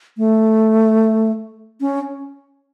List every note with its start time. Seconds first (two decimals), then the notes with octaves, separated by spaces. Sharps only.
0.18 A3
1.81 C#4